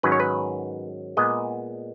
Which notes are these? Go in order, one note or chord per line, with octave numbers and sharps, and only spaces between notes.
G#2 D#3 F#3 C#4 B4
C#5
B4
A#2 G#3 B3 D#5